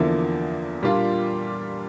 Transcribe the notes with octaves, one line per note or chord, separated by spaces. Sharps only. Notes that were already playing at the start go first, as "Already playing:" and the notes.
Already playing: E2 D3 F3 A#3 E4
A#2 G3 A#3 D4 F4